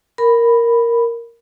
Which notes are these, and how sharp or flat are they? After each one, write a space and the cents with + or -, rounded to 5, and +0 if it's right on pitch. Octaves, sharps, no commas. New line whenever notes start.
A#4 +0 B5 +0